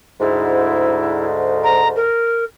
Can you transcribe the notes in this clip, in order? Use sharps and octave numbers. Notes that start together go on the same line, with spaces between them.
D2 G#2 E4
A#5
A#4